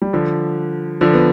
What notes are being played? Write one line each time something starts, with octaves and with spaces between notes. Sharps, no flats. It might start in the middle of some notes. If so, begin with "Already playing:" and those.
G3
D3 F3
D3 F3
B3